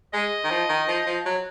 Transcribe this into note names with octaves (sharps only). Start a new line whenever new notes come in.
G#3 D#5
D#3
F3
D#3
F3
F3
F#3